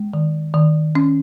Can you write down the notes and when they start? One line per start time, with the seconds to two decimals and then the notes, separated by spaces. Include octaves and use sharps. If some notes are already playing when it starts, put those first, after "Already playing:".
Already playing: G#3
0.14 D#3
0.54 D#3
0.95 C#4